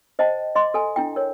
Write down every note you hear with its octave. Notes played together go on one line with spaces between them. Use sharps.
C5 D#5 G5 A5
D#5 C6 D6
A4 G#5
D4 E4 G5
A#4 C#5